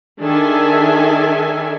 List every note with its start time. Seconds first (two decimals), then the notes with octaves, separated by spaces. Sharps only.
0.20 D#3 D4 G#4 A4 E5 G#5